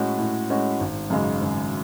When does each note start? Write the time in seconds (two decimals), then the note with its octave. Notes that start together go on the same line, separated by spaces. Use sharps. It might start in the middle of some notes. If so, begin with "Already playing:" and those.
Already playing: A2 G#3 C#4 F#4
0.18 A2
0.50 G#3 C#4 F#4
0.80 G#1
1.10 F#2 C#3 G#3
1.41 G#1